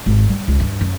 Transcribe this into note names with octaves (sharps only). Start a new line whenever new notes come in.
G#1
G3
C#2
G2
F#2